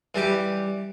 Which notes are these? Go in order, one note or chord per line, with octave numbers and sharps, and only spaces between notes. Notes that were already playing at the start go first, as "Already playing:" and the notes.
E3 G3 G4 D6